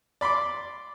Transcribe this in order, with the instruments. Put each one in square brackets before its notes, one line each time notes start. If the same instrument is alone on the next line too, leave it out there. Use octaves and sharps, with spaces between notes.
[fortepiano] D5 B5 C6 D6